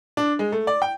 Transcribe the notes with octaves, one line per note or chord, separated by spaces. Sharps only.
D4
G#3
A3
D5
G5